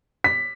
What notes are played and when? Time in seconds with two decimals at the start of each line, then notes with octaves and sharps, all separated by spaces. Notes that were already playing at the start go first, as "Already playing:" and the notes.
0.24 B6